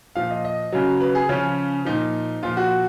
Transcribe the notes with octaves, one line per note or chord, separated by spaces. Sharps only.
A#2 F3 F5
D#5
D#5
C#3 F#3
B4
G#4
C#3 F3 C#4
A#2 F3 D#4
A#2 F3 F4
F#4